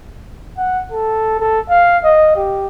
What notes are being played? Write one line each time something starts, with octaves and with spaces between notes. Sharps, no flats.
F#5
A4
A4
F5
D#5
G4